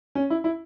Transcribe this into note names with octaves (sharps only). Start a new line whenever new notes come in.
C#4
E4
E4